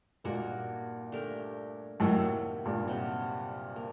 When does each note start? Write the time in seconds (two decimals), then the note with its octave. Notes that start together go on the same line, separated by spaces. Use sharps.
0.24 G2 A#2 A#3 D#4 F#4 A#4
1.12 A3 D4 G4 A#4
2.00 F#2 A2 C3 D#3 F#3 A#3
2.65 G2 A#2
2.88 C3 F#3 C4 F#4
3.76 A#3